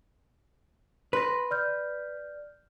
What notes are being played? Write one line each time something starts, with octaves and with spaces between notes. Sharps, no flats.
B4 C6 A#6
D5 F6 G6